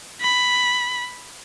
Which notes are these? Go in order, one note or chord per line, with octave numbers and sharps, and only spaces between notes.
B5